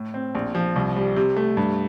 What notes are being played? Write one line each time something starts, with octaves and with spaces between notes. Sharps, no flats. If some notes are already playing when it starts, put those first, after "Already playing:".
Already playing: A2
C4
A#1
F3
C2
G3
C3
A3
G2